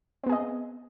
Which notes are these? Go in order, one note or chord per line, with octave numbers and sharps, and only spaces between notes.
B3 C4 G#4 D#5